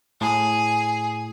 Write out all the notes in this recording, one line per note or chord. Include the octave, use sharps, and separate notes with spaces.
A2 G#4